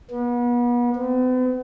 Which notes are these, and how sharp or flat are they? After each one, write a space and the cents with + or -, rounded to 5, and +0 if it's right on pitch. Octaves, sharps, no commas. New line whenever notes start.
B3 -35
B3 +45